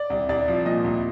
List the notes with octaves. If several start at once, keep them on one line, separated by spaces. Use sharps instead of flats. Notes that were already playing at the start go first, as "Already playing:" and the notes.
Already playing: D5
C2
C2 D5
F3
A#2 D#5
C2